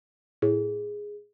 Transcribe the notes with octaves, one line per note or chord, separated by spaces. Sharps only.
A2 G#4